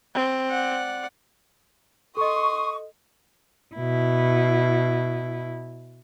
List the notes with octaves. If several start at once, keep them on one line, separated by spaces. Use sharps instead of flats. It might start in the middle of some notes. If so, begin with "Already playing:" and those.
C4
D5 F#5
A4 D#5 C6 C#6 D#6
B2 E4